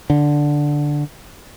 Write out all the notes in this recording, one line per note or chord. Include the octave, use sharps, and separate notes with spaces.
D3